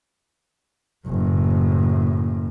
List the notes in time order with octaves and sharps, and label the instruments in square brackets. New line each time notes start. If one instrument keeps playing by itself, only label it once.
[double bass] F#1 A2